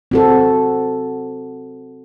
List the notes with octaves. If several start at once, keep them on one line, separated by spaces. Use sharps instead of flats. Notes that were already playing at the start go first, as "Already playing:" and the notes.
C4 F#4 A4